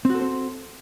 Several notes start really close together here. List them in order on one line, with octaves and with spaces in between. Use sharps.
C4 F#4 A4 C5